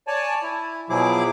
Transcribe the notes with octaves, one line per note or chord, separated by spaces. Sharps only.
C#5 D5 G#5 A5
E4
B2 F3 F#3 E4 G#4 D6